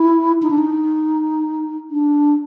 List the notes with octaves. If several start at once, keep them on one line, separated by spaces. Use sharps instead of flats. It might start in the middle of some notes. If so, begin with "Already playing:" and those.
Already playing: E4
D#4
D4
D#4
D4